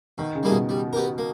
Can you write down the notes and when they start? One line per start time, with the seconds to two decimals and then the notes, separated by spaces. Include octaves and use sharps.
0.18 B2 D#3
0.35 C#3
0.43 G3 A#3 E4 G#4
0.51 B2
0.69 G3
0.93 B3 G4 A#4
1.18 A#3